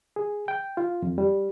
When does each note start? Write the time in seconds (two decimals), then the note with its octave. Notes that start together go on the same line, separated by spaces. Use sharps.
0.16 G#4
0.48 G5
0.77 F4
1.02 F2
1.18 G3